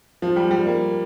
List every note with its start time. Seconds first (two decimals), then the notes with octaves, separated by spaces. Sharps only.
0.22 F3
0.36 G3
0.51 G3
0.65 A#3